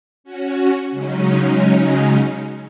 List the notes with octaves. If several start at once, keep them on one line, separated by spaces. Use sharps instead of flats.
C#4 F#4
C#3 F#3 G#3 C#4 D#4